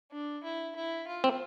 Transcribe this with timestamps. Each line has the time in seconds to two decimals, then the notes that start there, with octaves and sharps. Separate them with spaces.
0.12 D4
0.44 E4
0.76 E4
1.07 F4
1.24 C4